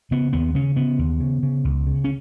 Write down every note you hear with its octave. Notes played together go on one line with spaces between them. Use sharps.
C#3 B3
D#2 B3
C#3 C#4
C#3 B3
D#2
C#3
C#3
C#2
C#3
C#4